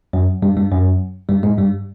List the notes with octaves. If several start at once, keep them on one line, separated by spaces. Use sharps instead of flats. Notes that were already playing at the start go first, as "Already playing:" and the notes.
F#2 F#3
G2 G3
G2 G3
F#2 F#3
G2 G3
G#2 G#3
G2 G3